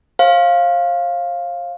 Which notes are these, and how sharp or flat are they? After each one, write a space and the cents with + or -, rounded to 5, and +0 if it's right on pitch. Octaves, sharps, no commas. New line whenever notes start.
C5 +45 F5 +0